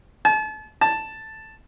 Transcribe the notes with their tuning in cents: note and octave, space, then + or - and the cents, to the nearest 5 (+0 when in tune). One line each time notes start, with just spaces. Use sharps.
A5 -40
A5 +0